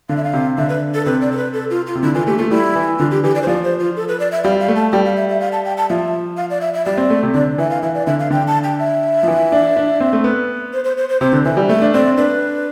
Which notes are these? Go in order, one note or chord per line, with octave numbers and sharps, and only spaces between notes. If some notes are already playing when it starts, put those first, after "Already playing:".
D3 F5
E5
F5
C3
D3 E5
B4
A4
C3 B4
D5
A4
B4
A4
F4
F4
C3
D3 E4
E3 F4
A3 G4
A3 F4
G3 E4
E3
D3 F4
G4
E3 G4
D5
C5
F3 D5
C5
F4
A4
B4
D5
E5
G3 F5
F5
A3
A5
G3 G5
F5
E5
E5
F5
A5
G5
A5
F3 E5
F5
D5
E5
E5
G3 D5
C4
A3
C3
D3 D5
E3 E5
F5
E3 E5
D5
D3 E5
F5
D3 G5
A5
G5
E5
F3
E3
D4
D4
C4
A3
B3
C5
C5
C5
C5
C3 C5
D3
E3 E5
G3
A3 E5
D4
C4 D5
D4 B4